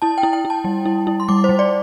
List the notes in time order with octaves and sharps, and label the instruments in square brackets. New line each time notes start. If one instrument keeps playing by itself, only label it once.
[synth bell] E4 A5
G5
E4
G5
E4
A5
G3
E4
E4
C6
G3 D6
C5
G3
D5